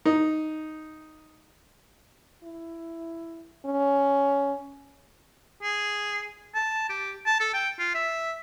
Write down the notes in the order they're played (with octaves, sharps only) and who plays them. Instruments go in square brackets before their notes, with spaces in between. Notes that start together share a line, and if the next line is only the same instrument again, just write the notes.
[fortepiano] D#4
[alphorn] E4
C#4
[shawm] G#4
A5
G4
A5
A4
G5
F4
E5